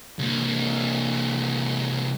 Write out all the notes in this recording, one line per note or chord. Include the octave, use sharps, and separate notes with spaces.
C2 A#3